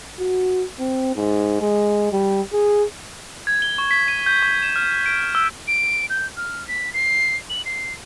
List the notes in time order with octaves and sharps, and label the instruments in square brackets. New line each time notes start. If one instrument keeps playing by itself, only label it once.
[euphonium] F#4
C4
G#2
G#3
G3
G#4
[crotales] G#6
G7
C#6
B6
D#7
G6
C#6
E7
F6
D7
E6
[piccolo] D7
G6
F6
B6
C7
F#7
C7